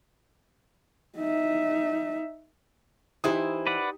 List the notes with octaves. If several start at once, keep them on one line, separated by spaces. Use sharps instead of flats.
D#4 E5
E3 D#4 E4 G4 C5 D#6
B4 D5 F#5